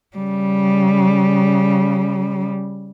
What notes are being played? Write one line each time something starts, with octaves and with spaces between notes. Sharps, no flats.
C#3 G3